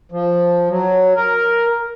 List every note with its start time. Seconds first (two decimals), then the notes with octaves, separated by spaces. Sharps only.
0.12 F3
0.70 F#3
1.16 A#4